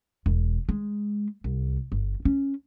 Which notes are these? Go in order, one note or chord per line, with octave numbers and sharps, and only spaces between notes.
E1
G#3
C2
G1
C#4